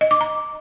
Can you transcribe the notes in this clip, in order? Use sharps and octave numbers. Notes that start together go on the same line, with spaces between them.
D#5
D6
A#5